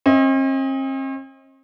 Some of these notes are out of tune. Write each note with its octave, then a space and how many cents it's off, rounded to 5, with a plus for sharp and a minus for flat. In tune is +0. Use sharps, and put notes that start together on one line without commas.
C4 +45 D#5 +25